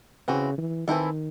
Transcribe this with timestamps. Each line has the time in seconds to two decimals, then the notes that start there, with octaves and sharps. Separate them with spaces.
0.28 C#3 E3 C4 F#4
0.58 E3
0.88 D#3 E3 C4 E4 A4